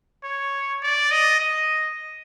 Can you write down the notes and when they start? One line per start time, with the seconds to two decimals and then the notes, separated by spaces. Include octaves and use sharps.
0.24 C#5
0.82 D5
1.11 D#5
1.40 D#5